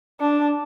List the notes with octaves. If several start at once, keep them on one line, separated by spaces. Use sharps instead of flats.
D4